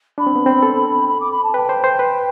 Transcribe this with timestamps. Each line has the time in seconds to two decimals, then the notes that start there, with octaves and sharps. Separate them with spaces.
0.18 D4 B5
0.27 C4
0.36 B3
0.46 C4
0.63 A4
1.08 B5
1.20 D6
1.31 B5
1.43 A5
1.54 B4 G5
1.69 C5
1.84 C5
1.99 B4